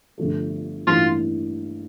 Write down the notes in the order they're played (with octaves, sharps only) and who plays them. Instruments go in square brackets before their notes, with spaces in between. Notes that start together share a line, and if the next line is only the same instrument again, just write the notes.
[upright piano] G1 G2 D3 F3 A3
[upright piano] A1 G2 E3 A#3 [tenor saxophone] F4